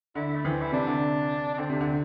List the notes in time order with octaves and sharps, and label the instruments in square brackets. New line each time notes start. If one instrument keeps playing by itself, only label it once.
[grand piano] D3 [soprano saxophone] E4
[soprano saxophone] A3
[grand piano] E3 [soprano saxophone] C4
[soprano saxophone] E4
[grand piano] C3 [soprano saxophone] D4
[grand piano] D3
[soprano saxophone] D4
[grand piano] D3 [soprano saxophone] C4
[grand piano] C3 [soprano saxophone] D4
[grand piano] D3
[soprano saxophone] C4